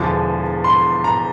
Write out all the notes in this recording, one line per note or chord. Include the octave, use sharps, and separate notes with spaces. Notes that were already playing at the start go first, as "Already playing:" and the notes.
Already playing: E1 E2 D3 F3
C6
A#5